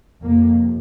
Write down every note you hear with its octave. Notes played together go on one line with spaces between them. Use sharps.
F2 C3 A#3